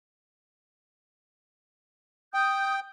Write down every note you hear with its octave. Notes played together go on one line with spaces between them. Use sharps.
G5 D#6 G6